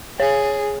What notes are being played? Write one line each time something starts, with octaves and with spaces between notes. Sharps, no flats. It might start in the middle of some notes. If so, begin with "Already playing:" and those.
G#4 C#5